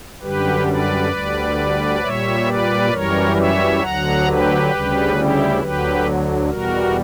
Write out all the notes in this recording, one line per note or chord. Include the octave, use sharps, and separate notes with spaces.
F#2 D3 G3 G4 B4
B4 D5
D2 D3 G3
A#2 G3 C#5 E5
B4 D5
F#2 E3 G3 A#4 C#5
C#5 E5
D2 D3 F#3 F#5 A#5
G4 B4
D2 C#3 G3
E4 G4
D2 D3 F#3 G4 B4
E2 B2 G3 F#4 A#4